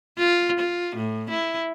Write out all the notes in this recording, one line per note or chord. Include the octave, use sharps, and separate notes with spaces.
F4
F4
A2
E4